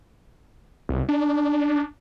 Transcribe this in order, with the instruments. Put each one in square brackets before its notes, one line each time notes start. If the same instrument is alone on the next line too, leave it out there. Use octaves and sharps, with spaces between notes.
[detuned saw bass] C2
D4